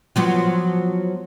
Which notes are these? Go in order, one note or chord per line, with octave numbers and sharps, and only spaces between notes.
F3 F#3 B3